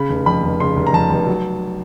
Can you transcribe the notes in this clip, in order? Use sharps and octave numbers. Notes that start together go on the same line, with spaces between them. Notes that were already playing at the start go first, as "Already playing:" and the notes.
Already playing: C#3 B5
F1
F2 B5
F1
C#3 C6
F1
A#5
F2 A5
F1
F#3